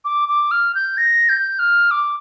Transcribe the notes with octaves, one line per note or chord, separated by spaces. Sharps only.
D6
D6
F6
G6
A#6
G6
F6
D6